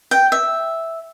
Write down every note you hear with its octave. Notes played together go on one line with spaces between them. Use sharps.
G5
E5